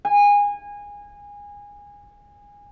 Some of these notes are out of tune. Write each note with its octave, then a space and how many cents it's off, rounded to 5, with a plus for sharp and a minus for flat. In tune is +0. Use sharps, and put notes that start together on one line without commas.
G#5 -25